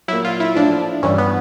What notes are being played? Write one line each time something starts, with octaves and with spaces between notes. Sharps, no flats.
A#2 F#3 E4
F4
E4
A2 F3 D4
G2 E3 G3 C#4
B3